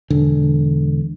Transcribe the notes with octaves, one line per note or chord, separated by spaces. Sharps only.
E1 D3